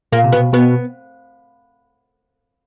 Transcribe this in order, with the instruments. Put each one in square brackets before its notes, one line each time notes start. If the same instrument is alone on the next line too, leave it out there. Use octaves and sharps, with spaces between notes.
[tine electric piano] A#2 [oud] A#3
[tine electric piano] C3
[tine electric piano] B2 [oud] B3
[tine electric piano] B2 [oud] B3